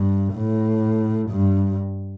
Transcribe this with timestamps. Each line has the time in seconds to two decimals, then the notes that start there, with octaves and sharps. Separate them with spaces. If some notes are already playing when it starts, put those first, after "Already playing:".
Already playing: G2
0.34 A2
1.30 G2